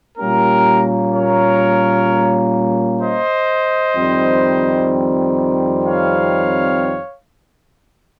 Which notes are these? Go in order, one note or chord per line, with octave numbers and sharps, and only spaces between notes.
A#2 G3 A#3 C#4 G4 A#4
A#4 C#5
C5 D#5
F2 D#3 G3 C4
C#5 F5